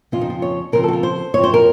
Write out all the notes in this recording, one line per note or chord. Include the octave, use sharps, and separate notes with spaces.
F2 C#3 F3 C4 F4
D#4
F4
C#5
C#3 F3 C4 A#4
F#4 A4
F4
C5
F#2 F3 C4 C#5
C5
A#4